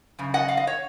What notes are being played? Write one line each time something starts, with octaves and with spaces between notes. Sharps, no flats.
F#2 C#3
D#5 F#5
F5
D#5
C#5